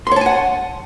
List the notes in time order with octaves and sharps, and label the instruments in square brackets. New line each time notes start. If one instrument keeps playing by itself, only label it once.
[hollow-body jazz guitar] C6
C#5
A5
G#5
F#5